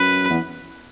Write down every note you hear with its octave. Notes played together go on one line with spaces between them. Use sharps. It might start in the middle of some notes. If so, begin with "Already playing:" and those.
Already playing: F#2 B4
E2